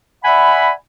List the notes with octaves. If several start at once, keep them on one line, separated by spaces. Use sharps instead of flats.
D5 E5 F#5 G#5 B5